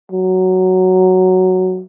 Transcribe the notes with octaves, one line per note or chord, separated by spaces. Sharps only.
F#3